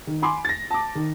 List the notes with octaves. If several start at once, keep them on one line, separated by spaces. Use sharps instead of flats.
D#3
G#5 B5 C6 D6
A6 A#6
A5 D6
D#3